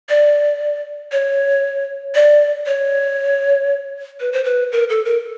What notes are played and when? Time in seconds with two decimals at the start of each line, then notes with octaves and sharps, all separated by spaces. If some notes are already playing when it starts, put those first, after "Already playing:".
0.09 D5
1.12 C#5
2.15 D5
2.67 C#5
4.20 B4
4.33 C5
4.44 B4
4.72 A#4
4.89 A4
5.05 A#4